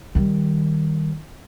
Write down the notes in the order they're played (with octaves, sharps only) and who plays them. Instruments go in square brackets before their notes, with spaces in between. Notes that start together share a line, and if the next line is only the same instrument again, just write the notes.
[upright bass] D#3 G3